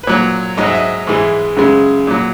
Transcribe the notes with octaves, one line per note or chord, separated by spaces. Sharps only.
B4
A#2 F#3 C#5
G#2 F#3 D#5
E5
D#5
G#2 E3 G#3
F#2 C#3 G#3
A#2 F#3